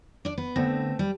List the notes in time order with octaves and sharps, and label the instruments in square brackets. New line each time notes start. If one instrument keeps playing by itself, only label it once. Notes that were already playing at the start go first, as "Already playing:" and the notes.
[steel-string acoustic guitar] D4 D5
B3
[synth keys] D3 B3 A#6 [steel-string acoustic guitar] A3 C4
[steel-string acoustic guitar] G3